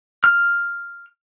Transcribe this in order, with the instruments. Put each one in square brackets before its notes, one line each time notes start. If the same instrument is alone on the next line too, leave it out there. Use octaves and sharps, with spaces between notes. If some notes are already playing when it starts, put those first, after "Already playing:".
[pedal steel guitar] F6